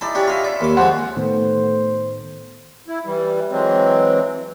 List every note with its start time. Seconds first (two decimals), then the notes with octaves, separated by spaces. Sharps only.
0.01 D#4 E4 G#4 D5 A5
0.15 D4 G4 C#5
0.27 D#4 F4 E5 A#5
0.45 D5 B5
0.61 D#2 D6
0.77 F3 G#3 C4 C#5 F#5
1.16 A2 D#3 A3 B3 C5
2.88 E4
3.05 E3 G3
3.50 E3 F#3 G#3 C4